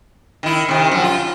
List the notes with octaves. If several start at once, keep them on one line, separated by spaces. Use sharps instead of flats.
D#3 E4
C3 D#3
F#2 F3
F4